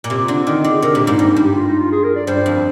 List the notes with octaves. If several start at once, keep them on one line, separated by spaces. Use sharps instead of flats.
A#2
C3 G4
F4
D3
F4
D#3 D#4
F4
D3
G#4
C3 A#4
A#2 G4
G#2 D#4
G2 D#4
D#4
G2
G4
F4
D#4
F4
G#4
A#4
D5
G2 C5
F2